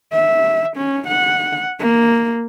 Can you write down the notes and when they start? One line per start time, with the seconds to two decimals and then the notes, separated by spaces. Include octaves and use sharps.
0.12 E5
0.77 C#4
1.08 F#5
1.79 A#3